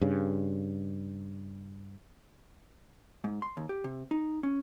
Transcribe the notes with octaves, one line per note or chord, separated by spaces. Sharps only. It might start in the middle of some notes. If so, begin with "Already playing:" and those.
G2 C#3
G#2
C6
D#2
G4
C3
D#4
C#4